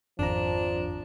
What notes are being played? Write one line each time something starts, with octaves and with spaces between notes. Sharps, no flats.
G#1 F2 F3 D4 A#5